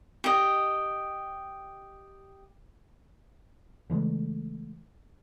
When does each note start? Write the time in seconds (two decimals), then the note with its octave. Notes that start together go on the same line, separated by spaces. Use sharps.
0.24 G4 D#5
3.90 C#3 E3 G#3 A3